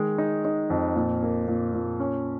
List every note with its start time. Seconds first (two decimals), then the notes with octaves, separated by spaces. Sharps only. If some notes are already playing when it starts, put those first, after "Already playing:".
Already playing: D#3 G#3
0.18 D#4
0.45 D#4
0.70 F2
0.96 A#2
1.23 A#3
1.47 A#2
1.73 A#2
2.00 C#4